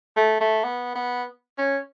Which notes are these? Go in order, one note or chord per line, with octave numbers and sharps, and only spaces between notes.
A3
A3
B3
B3
C#4